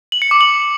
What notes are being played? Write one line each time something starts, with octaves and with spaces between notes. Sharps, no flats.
F#7
C#7
D6
F#7